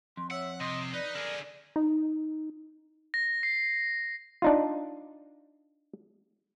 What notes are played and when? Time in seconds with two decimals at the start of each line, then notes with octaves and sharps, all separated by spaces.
0.17 F2 C6
0.31 C#5 E5 F#5
0.60 C3 D#5 C6
0.94 D#4 B4 D5
1.15 D3 G#4 A#4
1.76 D#4
3.14 A#6
3.43 C7
4.42 D4 D#4 F4